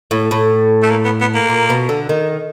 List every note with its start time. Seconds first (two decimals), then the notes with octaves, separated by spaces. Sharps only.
0.11 A2
0.31 A2
0.83 A3
0.90 A#3
1.05 B3
1.21 B3
1.34 A#3
1.49 A#2
1.70 B2
1.89 D3
2.09 D#3